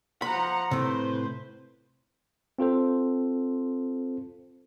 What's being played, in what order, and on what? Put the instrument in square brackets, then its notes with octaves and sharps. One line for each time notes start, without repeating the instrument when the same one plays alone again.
[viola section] F3 F#5 A#5 [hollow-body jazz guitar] B5
[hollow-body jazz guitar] A2 C3 [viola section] B4 C5
[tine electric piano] C4 F4 A4 C5